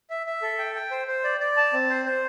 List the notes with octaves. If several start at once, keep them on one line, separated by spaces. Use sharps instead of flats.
E5
E5
A4
G5
G5
C5
C5
D5
D5
A5
C4
C5
C5